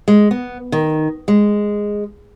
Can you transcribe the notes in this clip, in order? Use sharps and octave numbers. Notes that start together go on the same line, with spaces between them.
G#3
B3
D#3
G#3